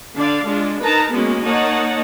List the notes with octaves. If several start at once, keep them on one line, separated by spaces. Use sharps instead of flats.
D3 D4 D5 F5
G#3 D4 F4
D#4 A#4 B4 A5 A#5
G#3 A#3 B3 C#4 F#4
A#3 D#4 C#5 F#5 A5